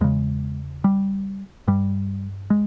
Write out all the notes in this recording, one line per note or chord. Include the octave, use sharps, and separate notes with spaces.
E2 C#3 G#3
G3
G2 G3
G#3